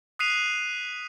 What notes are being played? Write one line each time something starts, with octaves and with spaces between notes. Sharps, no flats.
D#6 F#6 B6 C7 D#7 F7